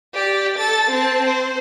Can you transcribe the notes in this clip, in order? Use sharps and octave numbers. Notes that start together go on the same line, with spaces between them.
G4 D5
A4 A6
C4 A5
C5